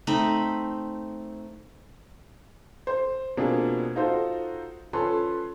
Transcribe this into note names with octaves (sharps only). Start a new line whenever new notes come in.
A3 C4 D#4 B5
C5
B2 F3 A#3 C4 D4 G#4
D#4 F4 F#4 A4 C5
F3 C#4 A4 B4 C6